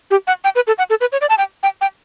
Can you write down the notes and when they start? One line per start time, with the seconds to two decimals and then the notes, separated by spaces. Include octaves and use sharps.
0.11 G4
0.27 F#5
0.44 G5
0.55 B4
0.67 A4
0.78 F#5
0.90 A4
1.01 B4
1.12 C#5
1.21 D5
1.30 A5
1.38 G5
1.63 G5
1.81 G5